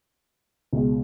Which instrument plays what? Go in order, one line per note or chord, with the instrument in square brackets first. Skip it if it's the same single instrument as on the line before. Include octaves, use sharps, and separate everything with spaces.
[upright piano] C#2 B2 G#3